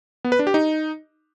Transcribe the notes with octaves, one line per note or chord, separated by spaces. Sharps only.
B3
B4
D4
G4
D#4